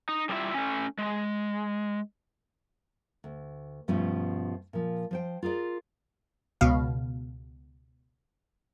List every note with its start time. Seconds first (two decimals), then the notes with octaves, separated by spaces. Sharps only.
0.09 D#4
0.29 G3 B3 D4 E4 F4 E5
0.54 A3 C#4
0.98 G#3
3.24 D2
3.88 G2 B2 F3 A3 B3 C#4
4.73 A#2 F3
5.11 F3 C5 G5
5.43 F4 G#4 A#4 D5
6.61 C#2 B2 F5